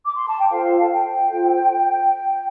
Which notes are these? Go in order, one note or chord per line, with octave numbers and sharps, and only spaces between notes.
D6
C6
A5
G5
F4 A4 C5 F5
A5
G5
F4 A4 C5